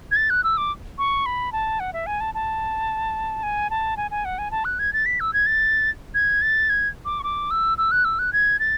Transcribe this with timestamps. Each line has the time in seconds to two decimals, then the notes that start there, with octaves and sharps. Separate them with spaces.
0.11 G#6
0.16 A6
0.30 F#6
0.44 E6
0.57 D6
0.98 C#6
1.26 B5
1.53 A5
1.80 F#5
1.93 E5
2.07 G#5
2.21 A5
2.34 A5
3.43 G#5
3.70 A5
3.97 G#5
4.11 G#5
4.25 F#5
4.38 G#5
4.51 A5
4.65 F#6
4.79 G#6
4.93 A6
5.06 B6
5.20 E6
5.33 G#6
5.46 A6
6.15 G#6
6.42 A6
6.70 G#6
7.05 D6
7.20 C#6
7.23 D6
7.51 E6
7.78 E6
7.92 F#6
8.05 E6
8.19 F#6
8.33 G#6
8.59 A6